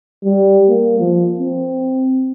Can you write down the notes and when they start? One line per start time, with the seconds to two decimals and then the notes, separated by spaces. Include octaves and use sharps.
0.24 G3
0.69 A#3
1.00 F3
1.40 C4